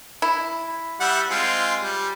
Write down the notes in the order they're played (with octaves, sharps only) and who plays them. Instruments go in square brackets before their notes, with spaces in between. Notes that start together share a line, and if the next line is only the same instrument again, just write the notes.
[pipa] E4
[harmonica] G3 E5 F#5
G#3 C4 F4
G3